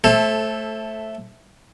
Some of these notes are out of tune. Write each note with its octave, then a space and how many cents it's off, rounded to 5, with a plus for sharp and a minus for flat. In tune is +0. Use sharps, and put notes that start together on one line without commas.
A3 +0 A4 -10 C5 +35